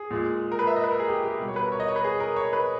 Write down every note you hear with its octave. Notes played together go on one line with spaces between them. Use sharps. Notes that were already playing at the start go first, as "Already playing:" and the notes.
Already playing: G#4
A#2 G#3
A#4
B4
E5
D#5
B4
A#4
G#4
G4
G4
B2 G3
C#5
B4
A#4
C#5
D#5
C#5
B4
G#4
A#4
C#5
B4